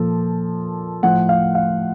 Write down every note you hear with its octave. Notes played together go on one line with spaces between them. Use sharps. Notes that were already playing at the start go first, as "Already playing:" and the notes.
Already playing: A#2 F3 A4
A2 F3 F#5
F5
F5